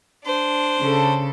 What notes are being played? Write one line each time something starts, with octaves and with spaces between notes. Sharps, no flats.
D4 C5
C#3 A4